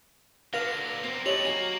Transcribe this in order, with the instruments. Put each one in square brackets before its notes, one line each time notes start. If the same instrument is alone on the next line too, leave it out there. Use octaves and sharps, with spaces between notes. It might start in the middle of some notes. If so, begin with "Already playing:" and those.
[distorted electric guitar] D3 F#3 [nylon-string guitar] B4 [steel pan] F5 [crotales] A#6 F7
[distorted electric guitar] F#2 A#3 [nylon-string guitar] C4
[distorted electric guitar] A3 B3 [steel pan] G4 C#5 D#5 [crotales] F7 F#7
[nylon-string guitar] F#3 G#4 [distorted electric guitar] A#3